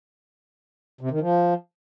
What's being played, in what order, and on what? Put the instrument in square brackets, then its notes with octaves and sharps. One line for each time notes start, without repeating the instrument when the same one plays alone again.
[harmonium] C3
D#3
F3